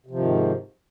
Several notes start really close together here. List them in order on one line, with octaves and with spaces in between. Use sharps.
C3 F3 D#3 G#2